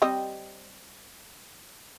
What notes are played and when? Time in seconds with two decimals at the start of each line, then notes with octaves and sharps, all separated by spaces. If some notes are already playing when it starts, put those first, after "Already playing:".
0.02 G3 C4 D#5